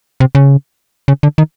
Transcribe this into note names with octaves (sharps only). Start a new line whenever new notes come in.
C3
C#3
C#3
D3
D#3